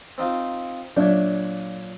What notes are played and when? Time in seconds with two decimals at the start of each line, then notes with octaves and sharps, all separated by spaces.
0.18 C4 D#4 F4
0.97 A#2 F#3 D4 C#5